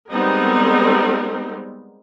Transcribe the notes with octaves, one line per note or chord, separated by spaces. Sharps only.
G3 G#3 B3 C4 D#4 A#4